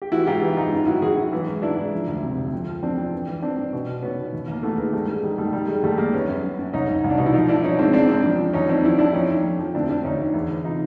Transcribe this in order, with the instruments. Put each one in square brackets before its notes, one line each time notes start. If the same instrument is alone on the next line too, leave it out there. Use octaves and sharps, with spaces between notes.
[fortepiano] G4
E3 E4 F#4
G#2 F4 G4
E3
G#2 D#4 F4
F#2
D#3 E4 F#4
D#3 F#4 G#4
F#2
E3
G#2
E3 D4 E4
G#2
F3
D2
C3
D2
F2
F3
F2 C4 D4
F2
E3
E3
E3 C4 D4
G2
B2
B2
B2 B3 C#4
B2
D#2
D#2 A#3
E3 A3 B3
E3 G#3 A#3
G#2 G3 A3
G#2 G#3
D#3 G3
D#3 G3 A3
D#3 G3
D#3 G#3
D#2 G3 A3
D#3 G#3 A#3
F#2 B3 C#4
F#2
F#2
F#2
C2 C#4 D#4
C2
C2
D4
B2 D#4
E4
F3 D#4 F4
F3 D4 E4
F3 C#4 D#4
G#2 C4 D4
C#3 C4 D4
F#2 C4 D4
F3
F3
D#2 C#4 D#4
F3 C4 D4
F3 D4 E4
D#2 D4 E4
F2 C#4 D#4
F3
F2
F3
D2 C4 D4
D2 D4 E4
D2 C#4 D#4
D2
E2
E3
C3 D#4 F4